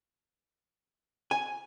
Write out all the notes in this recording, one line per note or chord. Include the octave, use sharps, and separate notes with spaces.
G#5